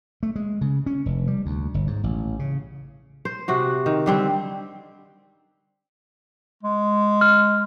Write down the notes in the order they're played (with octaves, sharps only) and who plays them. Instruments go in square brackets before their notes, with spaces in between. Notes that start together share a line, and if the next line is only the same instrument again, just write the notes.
[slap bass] A3
G#3
C#3
C#4
F1
G3
D2
G1
G#2
A1
C#3
[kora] C5
C3 F#4
D#3
D3 G3 C4
[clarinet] G#3
[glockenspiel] F6